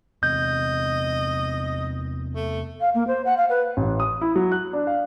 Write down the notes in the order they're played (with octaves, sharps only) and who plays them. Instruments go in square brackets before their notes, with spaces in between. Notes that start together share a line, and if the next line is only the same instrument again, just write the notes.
[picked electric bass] E2 C3 [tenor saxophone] D#5 [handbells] G6
[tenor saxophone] A3
[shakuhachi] F5
A#3
C5
F#5
F5
B4
[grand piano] A1
D#6
E4
F#3
F#6
D4
F5